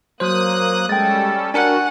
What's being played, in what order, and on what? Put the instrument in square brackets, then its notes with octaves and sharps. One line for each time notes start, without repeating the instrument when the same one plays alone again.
[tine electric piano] F#3 C5 [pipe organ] A#3 D#6 F#6
[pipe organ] G3 C#4 A4 [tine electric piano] G#3 [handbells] G5 A6
[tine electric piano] D4 A#4 C#7 [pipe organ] F#4 [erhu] F#5 [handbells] G#5